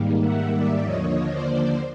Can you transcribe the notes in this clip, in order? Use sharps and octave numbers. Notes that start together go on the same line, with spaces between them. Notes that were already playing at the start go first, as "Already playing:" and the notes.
Already playing: G#2 D#3 G3 A#3
E5 F#5
D5 E5
D#2 D3 F3 A#3 C#5 D#5
C5 D5